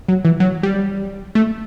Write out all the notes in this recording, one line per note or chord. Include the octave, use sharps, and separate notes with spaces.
F#3
E3
F#3
G3
A3